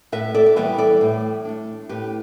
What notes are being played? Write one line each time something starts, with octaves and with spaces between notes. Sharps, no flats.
A2 B4 E5
A4 D5
D5
E3 G3 B3 E4 B4 E5
A4 D5
A2
A3 D4
A2 G4 B4